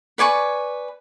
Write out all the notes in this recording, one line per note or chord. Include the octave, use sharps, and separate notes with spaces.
B4 D5 G#5 C#6